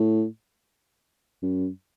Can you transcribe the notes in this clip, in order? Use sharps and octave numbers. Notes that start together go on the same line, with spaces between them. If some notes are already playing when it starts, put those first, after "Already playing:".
Already playing: A2
F#2